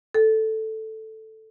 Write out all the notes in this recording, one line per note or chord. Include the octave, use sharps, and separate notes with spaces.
A4